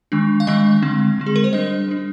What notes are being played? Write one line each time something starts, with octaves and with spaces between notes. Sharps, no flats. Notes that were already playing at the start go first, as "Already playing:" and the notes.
D#3 G#3 D4
F5
D#3 G#3 D4 D#5
D3 G#3 C4
D3 G#3 C4
G#4
A#4
C5
G3 D4 D#5
G3 D4